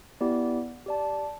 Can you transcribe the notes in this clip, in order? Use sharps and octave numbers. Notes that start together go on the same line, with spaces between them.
B3 E4 G4 D5
G4 D5 A5